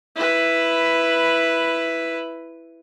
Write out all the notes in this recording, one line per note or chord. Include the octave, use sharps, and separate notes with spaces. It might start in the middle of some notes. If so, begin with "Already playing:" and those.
E4 B4